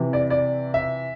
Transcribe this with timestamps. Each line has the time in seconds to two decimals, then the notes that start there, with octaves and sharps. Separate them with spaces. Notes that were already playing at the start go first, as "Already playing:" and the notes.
Already playing: C3 E3
0.13 D5
0.30 D5
0.74 E5